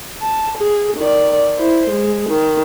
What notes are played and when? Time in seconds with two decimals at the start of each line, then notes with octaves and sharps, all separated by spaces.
0.22 A5
0.57 G#4
0.97 D#3 D5
1.58 E4 C5
1.90 G#3
2.29 D#3